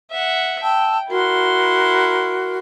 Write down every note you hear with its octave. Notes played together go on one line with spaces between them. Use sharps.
E5 F#5
G5 A5 E6
E4 F#4 A#4 C6